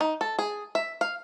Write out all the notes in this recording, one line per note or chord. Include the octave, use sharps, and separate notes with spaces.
D#4
A4
G#4
E5
F5